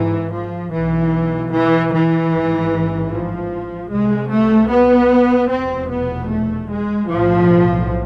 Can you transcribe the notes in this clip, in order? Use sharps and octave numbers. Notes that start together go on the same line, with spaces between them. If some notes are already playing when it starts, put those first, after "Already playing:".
Already playing: G#1 G#2 E3
F3
B1 B2 E3
E3
E3
A1 G#2
F3
C2 C3 G#3
A3
B3
F1 E2 B2 C4
B3
A3
G#3
B1 A2 F3